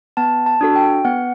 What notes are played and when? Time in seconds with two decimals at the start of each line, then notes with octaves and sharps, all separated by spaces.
0.17 B3 A5
0.46 A5
0.61 D4 F#4 A4
0.75 G5
1.05 B3 F#5